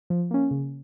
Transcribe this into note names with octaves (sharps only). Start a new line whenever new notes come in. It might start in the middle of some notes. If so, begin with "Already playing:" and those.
F3
A#3 C#4
C#3